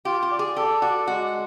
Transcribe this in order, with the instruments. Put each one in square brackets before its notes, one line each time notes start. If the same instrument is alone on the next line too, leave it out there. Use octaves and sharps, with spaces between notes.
[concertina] F4 [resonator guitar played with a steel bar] G4
[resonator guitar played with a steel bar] G4
[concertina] D5
[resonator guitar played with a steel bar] G#4
[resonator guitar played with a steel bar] G4 [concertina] A4
[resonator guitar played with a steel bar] F#4 [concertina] D5
[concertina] G#3 [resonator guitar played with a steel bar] F#4